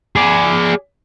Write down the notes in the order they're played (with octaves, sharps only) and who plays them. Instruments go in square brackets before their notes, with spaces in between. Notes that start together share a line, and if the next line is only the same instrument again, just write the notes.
[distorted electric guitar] G#4 D5